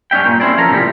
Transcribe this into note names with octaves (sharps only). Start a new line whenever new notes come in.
G2 C#4 D4 E5 G5
G2 A#2
C4 C#4 E4 G#4 D5
F3 C#4 A4 A#4
A2 C3 F3 G3